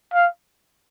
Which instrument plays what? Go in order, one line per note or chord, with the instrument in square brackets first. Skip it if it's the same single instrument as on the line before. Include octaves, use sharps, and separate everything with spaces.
[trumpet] F5